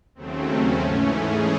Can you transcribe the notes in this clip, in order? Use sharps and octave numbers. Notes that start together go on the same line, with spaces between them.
D#2 C#3 F#3 A3 C4
C#4
G#2 E3 A3
G#4